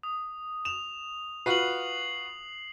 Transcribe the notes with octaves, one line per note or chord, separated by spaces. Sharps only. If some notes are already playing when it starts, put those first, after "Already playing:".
D#6
E7 F7
F4 F#4 B4 C7 F#7